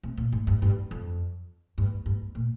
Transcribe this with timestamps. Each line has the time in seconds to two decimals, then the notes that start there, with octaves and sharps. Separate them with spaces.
0.03 C3
0.17 A#2
0.32 G#2
0.47 G2
0.62 G2
0.91 F2
1.78 G2
2.06 G2
2.35 A#2